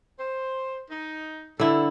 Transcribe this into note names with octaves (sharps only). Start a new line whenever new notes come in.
C5
D#4
G2 D3 E4 A4